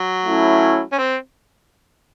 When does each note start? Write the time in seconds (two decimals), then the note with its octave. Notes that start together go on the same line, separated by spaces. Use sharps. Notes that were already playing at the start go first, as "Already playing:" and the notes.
Already playing: F#3
0.25 A3 C#4 E4
0.92 C#4
0.98 C4